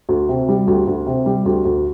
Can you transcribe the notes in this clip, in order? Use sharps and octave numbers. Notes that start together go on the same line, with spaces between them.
D2
C3
G3
D2
D2
C3
G3
D2
D2